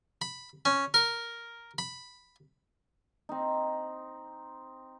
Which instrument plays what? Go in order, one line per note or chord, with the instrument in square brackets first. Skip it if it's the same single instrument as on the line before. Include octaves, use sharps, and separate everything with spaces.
[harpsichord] B5
C#4
A#4
B5
[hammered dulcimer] C4 D#4